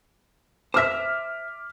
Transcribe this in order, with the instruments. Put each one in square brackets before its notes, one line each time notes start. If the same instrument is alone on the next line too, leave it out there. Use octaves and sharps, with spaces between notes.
[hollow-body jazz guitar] C5 E5 [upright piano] D6 F6 B6